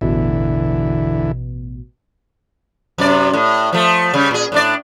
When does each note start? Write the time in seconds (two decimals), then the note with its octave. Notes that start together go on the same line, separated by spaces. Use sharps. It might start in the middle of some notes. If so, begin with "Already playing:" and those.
0.01 A1 E2 B2 D3 E4
2.98 F#2 C3 D5
3.33 A2
3.73 F3 A3
4.14 C#3 G3
4.31 A#2 G#4
4.52 A2 D4 D5